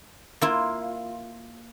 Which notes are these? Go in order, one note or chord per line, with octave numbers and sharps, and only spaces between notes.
A#3 E4 F4